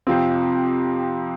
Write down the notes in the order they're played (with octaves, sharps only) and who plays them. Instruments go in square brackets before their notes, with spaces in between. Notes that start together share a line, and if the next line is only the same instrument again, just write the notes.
[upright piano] F2 C3 F3 C4